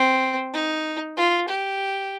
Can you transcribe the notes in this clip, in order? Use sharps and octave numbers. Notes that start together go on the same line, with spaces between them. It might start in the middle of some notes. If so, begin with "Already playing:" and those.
Already playing: C4
D#4
F4
G4